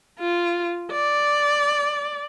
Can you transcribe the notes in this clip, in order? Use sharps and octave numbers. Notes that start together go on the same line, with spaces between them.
F4
D5